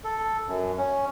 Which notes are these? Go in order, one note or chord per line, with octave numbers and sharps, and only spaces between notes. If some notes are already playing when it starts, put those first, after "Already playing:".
A4
F#2
C#4